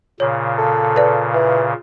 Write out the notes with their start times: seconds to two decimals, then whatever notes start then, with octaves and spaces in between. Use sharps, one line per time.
0.20 A#2 C#3 C#5
0.58 A4
0.96 B4 D5
1.34 E3